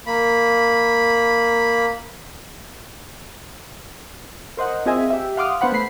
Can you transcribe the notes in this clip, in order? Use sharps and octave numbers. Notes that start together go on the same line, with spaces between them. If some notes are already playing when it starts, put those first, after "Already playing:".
A#3 B5
A#4 C5 D#5 F#5
C4 F4 G#4 D#5 E5 G#5
G4 E5
F5 F#5 C6 D6 D#6 F6
B3 D4 C5 F#5 B5
A3 C5 B5 C7